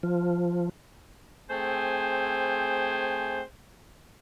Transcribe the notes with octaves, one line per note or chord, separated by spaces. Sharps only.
F3
A3 C4 G#4 C5 G5 G#5